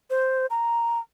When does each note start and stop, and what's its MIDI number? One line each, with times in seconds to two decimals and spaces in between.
0.10 0.46 72
0.50 0.99 82